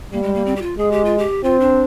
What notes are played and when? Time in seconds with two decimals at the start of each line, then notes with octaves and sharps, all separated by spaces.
0.12 G3 A#3
0.23 G#3
0.35 A#3
0.46 C4
0.56 G4
0.62 F4
0.78 G#3 G#4
0.91 G4
1.05 F4
1.18 G4
1.44 C4 F4
1.60 D4